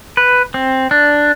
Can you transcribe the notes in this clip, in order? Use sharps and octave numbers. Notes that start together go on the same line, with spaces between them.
B4
C4
D4